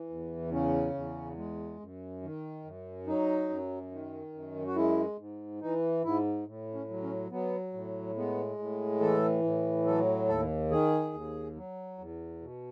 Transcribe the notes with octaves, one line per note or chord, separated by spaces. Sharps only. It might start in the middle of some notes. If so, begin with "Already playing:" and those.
Already playing: E3
E2
C#3 C#4
E2
G#3
F#2
D#3
F#2
F#3 D#4
F#2
D#3
F#2
F#4
G#3 E4
G#2
E3 D#4
G#2 E4
A2
C#4
F#3
C#4
F#3 B3
A2
G#3 B3
A2
E3 A4
A2
F#3 A4
D#2 A4
D#3 G#4
D#2
F#3
E2
B2